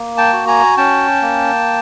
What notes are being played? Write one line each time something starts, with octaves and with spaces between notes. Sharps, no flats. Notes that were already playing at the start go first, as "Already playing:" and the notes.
Already playing: A#3
G5 A5
F#4
G#5 A#5
C#4 G5 A5
A#3